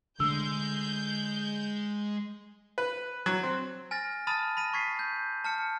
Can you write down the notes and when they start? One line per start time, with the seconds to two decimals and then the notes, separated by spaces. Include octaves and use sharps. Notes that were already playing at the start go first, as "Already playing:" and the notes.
0.20 D3 G#3 A3 E6 G6
2.78 B4
3.26 F#3
3.43 C4
3.91 G#5 F6 A6 A#6
4.27 A5 B5 D#6 F6 A6 D#7
4.57 B5 A#6 D#7
4.73 C#6 G#6 B6 C7
4.99 G6
5.44 A5 F6 C#7